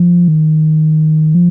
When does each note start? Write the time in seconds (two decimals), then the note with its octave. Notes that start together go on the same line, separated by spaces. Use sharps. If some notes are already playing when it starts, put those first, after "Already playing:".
Already playing: F3
0.28 D#3
1.35 F3